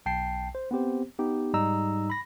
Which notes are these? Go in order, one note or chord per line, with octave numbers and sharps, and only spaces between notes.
B1 G5 A5 C7
C5
B3 C4 G4 C5
B3 D#4 G4
G#2 G3 D#4 A#5 E6
B5 A#6